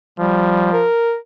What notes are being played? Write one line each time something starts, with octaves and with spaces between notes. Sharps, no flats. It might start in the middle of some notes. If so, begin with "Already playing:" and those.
F3 G3
A#4